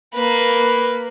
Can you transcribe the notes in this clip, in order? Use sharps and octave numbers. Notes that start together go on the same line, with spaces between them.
A#3 B4